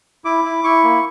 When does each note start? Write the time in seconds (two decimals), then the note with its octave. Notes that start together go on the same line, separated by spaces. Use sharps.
0.25 E4 D6
0.45 E4
0.64 E4 C#6
0.84 A#3